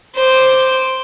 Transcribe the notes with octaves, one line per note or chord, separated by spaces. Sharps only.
C5 D6